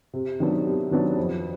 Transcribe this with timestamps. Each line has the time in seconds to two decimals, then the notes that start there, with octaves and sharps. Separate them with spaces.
0.13 C3
0.40 D#3 F#3 B3 D4
0.66 C3
0.91 D#3 F#3 B3 D4
1.17 F2